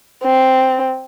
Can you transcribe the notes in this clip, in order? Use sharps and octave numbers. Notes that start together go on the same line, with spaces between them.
C4